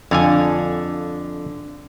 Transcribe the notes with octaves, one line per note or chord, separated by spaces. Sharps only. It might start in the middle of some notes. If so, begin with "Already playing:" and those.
F2 D3 F5 G#5